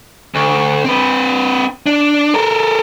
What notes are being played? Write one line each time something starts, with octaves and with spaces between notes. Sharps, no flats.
D2
C4 B4
D4
A4 A#4